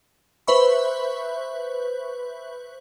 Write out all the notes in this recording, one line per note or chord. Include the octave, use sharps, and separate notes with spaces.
B4 C5 E5 B5 C#6